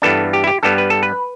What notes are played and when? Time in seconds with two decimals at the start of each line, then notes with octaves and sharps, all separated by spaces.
0.02 G2 E3 B3 D4 A4
0.33 G4
0.44 E4
0.47 G4
0.63 G2 G3 B3 A4
0.78 B4
0.90 A4
1.03 B4